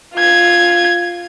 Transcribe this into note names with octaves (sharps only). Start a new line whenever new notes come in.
F4 G#6